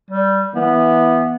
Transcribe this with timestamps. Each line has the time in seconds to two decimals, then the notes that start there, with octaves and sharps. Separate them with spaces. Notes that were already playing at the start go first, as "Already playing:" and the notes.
0.11 G3
0.55 E3 B3